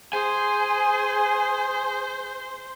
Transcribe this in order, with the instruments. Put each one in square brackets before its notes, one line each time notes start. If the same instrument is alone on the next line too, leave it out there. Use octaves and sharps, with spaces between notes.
[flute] G#4 [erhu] C5 [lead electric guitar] G#5